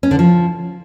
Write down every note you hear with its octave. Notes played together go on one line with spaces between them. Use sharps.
C#4
D3
F3